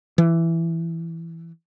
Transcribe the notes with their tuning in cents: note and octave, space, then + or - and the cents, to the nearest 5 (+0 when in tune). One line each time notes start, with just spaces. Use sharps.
E3 +10